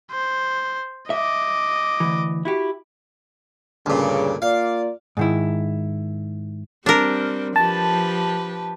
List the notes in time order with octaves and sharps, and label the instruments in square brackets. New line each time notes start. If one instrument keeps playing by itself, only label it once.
[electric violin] C5
[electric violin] D#5 D6 [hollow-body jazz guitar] E5
[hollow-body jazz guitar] D2 E3
E4 F#4 G4
[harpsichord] D2 A#2 [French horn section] G2 C#3
[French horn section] A#3 F4 D5 [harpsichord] F5
[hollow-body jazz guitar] G#2 D#3 E4
[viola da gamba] G3 C4 [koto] D4 A#4
[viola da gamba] F3 G4 B4 [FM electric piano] A5